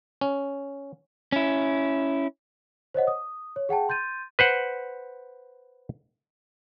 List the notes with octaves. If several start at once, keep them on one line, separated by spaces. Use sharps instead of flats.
C#4
C#4 E4
C5 C#5 D#5 F#5
D#6
C#5
G#4 F#5 G5 A5
C6 G6 A6 D#7
B4 C5 F#5